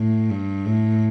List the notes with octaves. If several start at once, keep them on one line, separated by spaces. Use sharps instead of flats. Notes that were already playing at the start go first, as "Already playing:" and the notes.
Already playing: A2
G2
A2